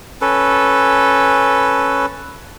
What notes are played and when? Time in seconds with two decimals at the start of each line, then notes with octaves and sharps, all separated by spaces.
0.21 C#4 A4 B4